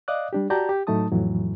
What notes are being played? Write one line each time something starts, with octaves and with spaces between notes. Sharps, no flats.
D5 D#5 F5 D6 D#6 F#6
G3 D4 G4
F#4 G4 D5 A5 A#5 G6
G4
A2 F#3 A3 D#4 A5 D#6
F2 A2 E3 F#3